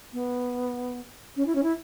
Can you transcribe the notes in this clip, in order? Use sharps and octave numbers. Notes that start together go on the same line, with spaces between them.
B3
C#4
E4
C#4
E4